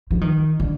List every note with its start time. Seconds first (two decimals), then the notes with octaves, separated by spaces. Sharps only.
0.11 F3
0.21 D#3
0.60 D3